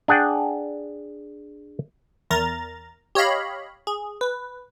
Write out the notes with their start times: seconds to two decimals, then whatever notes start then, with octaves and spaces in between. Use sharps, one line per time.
0.08 D4 G#4 F#5 G5
2.30 E2 A#4 A#5 A6
3.15 G4 C#5 D#5 F5 B5
3.87 G#4
4.21 B4